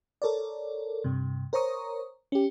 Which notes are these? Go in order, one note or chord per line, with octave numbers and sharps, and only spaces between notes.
A4 A#4 C#5 D5
G2 C3
A#4 C5 C#5 A#5 C#6 D#6
C#4 G4